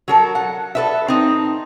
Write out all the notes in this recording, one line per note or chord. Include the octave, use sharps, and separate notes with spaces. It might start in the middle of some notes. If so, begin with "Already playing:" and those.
F#3 A4 A#4
F#5
A4 B4 E5
C4 D#4